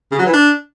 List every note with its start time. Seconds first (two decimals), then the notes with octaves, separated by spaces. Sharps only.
0.11 C#3
0.19 F#3
0.26 E3
0.33 D4